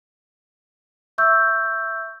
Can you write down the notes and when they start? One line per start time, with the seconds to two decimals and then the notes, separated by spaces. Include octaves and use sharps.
1.18 E5 C#6 E6 G6